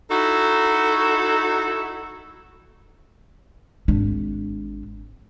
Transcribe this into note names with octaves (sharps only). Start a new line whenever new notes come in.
D#4 E4 F#4 A4
G#1 D4